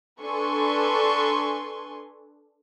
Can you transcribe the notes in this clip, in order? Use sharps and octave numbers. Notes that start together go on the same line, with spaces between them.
D4 A4 B4 G#5 C6 C#6